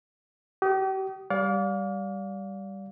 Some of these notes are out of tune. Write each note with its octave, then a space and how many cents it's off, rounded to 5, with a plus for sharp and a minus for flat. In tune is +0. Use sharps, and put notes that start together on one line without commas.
G4 -40 D#6 +0
G3 +0 D5 -30 F5 +25